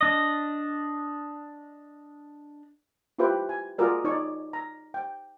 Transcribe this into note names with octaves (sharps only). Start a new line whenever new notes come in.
D4 D#5
E4 F4 G4 B4 C5 G5
G#5
F4 F#4 G#4 A#4 D5
D#4 C#5 D5 C#6
A#5
G5